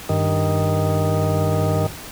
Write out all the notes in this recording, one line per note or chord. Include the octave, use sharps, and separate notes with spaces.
G2 D#3